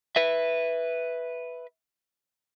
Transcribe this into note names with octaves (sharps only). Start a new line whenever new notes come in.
B4 E5